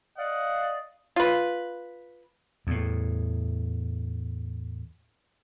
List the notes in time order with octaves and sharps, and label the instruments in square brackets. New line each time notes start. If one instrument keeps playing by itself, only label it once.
[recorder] D5 [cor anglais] D#5 [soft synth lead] F5 [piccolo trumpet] F#5
[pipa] F4 B4
[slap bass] E2 A2